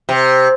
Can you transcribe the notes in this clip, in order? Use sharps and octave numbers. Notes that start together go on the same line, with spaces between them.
C3